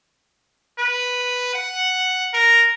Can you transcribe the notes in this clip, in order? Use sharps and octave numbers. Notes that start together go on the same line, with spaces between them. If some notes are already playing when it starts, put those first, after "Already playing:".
B4
F#5
A#4